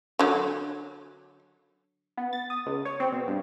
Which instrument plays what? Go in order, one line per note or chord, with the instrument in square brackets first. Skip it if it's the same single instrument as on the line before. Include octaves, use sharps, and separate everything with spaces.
[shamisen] D3 F#3
[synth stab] B3
A6
D#6
C#2
C#5
C4
B2
G2